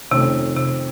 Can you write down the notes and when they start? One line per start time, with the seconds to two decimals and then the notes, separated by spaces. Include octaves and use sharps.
0.11 F2 C3 D#3 A3 C#4
0.57 C3